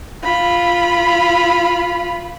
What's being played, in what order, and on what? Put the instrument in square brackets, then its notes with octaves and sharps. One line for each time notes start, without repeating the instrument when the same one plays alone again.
[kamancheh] F4 B5